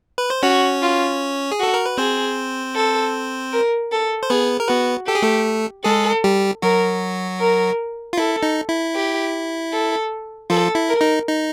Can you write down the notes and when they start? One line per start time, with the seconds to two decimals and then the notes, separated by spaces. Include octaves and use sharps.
0.18 B4
0.30 C5
0.43 C#4 F#4 C#5
0.82 F4
1.52 G#4
1.59 F#4 A4
1.74 A#4
1.86 B4
1.98 C4 G#4 C5
2.75 A4
3.53 A#4
3.92 A4
4.23 C5
4.30 B3 G#4 B4
4.60 A#4
4.68 B3 F#4 B4
5.07 G4 A4
5.15 G#4
5.22 A3 A4
5.84 G#3 G#4 A4
6.24 G3 G4
6.62 F#3 F#4 A#4
7.40 A#4
8.13 F4
8.18 E4 A4
8.43 D#4
8.69 E4
8.95 G4
9.73 A4
10.50 F3 F4 A4
10.75 E4
10.89 A#4
11.01 D#4
11.27 D#4